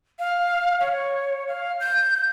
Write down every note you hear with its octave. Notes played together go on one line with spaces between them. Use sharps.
F5
C#5
F5
G6